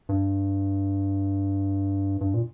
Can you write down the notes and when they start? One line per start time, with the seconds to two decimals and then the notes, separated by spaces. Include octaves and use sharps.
0.09 G2
2.21 G2
2.34 A#2